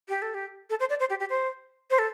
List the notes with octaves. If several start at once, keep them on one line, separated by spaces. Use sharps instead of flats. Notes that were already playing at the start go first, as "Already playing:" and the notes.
G4
A4
G4
A4
C5
D5
C5
G4
G4
C5
C5
A4